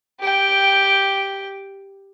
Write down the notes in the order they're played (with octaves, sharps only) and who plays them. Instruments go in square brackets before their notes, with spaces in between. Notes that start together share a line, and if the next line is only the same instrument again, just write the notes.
[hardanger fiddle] G4 G5